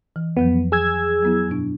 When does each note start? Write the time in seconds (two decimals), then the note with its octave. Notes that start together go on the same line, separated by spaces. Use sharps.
0.16 E3
0.37 F2 F3 F#3 B3
0.72 G#4 E6 G#6
1.23 F#3 B3 E4
1.48 G2 B2 D4